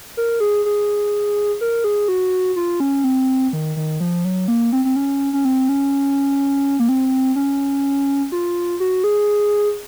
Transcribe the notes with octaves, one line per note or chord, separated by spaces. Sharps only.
A#4
G#4
G#4
A#4
G#4
F#4
F4
C#4
C4
D#3
D#3
F3
F#3
A#3
C4
C4
C#4
C#4
C4
C#4
A#3
C4
C#4
F4
F#4
G#4